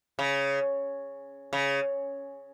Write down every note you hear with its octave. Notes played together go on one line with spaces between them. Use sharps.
C#3
C#3